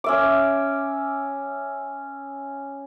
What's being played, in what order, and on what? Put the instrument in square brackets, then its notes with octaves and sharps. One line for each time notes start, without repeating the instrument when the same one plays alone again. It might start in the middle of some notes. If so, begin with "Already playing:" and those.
[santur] C#4 E5 D6